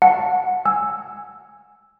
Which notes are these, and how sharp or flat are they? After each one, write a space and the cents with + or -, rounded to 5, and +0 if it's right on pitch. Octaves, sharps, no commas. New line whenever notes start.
F#5 -20 A5 +0
G#5 +0 E6 +0